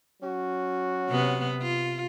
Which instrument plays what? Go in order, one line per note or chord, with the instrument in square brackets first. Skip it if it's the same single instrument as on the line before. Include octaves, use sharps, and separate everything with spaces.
[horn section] F#3 C#4 F#4
[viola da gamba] C3 B3
F4